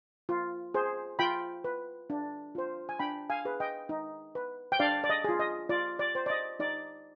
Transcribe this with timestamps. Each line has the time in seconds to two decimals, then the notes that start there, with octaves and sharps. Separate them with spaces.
0.29 F4
0.74 G#4 C5
1.19 F4 G5 B5
1.64 B4
2.10 D4
2.55 F4 C5
2.89 G#5
2.99 D4 G5 B5
3.30 F5 G#5
3.45 G#4 B4
3.60 D#5 G5
3.89 D#4
4.35 B4
4.72 G5
4.79 D4 D5 F5
5.04 D5
5.10 D#5
5.24 F4 G#4
5.40 D#5
5.69 F4 D5
5.99 D5
6.15 C5
6.26 D5
6.30 D#5
6.60 D#4 D5